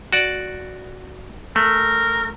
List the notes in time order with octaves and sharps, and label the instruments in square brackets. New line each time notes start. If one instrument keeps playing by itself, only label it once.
[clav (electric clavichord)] F#4 D5
[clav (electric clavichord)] A3 [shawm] A#4